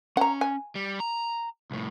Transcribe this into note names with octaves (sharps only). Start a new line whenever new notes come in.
C#4 F#5 A#5
G#5
G3
A#5
C2 A2